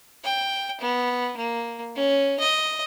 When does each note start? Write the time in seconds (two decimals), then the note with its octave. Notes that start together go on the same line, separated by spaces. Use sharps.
0.24 G5
0.80 B3
1.37 A#3
1.95 C#4
2.40 D#5